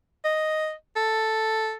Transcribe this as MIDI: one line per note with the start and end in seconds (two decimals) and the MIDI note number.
0.25 0.73 75
0.96 1.77 69